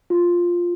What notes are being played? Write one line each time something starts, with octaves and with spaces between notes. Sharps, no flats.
F4